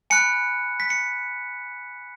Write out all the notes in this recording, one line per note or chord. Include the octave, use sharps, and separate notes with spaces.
G#5 B5 F#6 C#7
B6
C#7